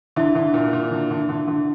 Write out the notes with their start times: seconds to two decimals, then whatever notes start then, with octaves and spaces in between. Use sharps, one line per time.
0.16 D3 E4 E5
0.35 D3
0.54 A#2
0.73 A#2
0.91 D3
1.11 D3
1.29 D3
1.48 D3